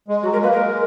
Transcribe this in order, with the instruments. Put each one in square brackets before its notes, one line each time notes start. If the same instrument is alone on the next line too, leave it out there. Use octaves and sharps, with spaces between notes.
[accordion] G#3
[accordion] F#3 [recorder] F#4
[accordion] G#3 [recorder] A#4
[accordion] A#3 [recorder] B4
[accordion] G#3 [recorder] A#4